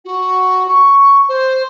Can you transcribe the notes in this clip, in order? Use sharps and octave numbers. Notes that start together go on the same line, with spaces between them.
F#4
C#6
C5